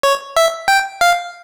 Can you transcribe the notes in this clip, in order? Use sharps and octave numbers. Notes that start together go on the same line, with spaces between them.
C#5
E5
G5
F5